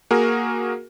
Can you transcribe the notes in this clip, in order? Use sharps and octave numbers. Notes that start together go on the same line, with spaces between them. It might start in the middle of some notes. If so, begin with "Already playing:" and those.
A#3 F#4 G#4 A#4